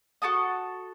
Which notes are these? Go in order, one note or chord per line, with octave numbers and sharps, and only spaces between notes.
F#4 A4 A5 D#6